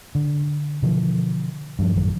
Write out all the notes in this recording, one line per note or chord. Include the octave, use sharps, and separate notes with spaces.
D3
B2 D3 E3 F3
G2 F3
A1 F#2 D#3 F#3